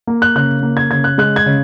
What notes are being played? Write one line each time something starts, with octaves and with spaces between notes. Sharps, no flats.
A#3
F#6
C#3 F#6
A#3
G#6
C#3 G#6
F#6
G#3 F#6
G#6
C#3